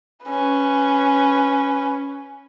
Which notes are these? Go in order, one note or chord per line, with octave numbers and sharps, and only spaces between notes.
C#4 B4